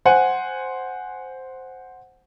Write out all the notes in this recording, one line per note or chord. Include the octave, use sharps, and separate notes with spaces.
C5 F#5 G#5